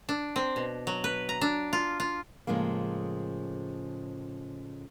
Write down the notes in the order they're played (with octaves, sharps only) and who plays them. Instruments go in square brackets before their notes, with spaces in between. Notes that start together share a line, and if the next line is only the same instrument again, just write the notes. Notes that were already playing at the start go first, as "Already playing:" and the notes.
[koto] D4
C4
B2
F#3
B4
A#5
D4
F4
F4
[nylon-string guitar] A2 C#3 F3 G#3 A#3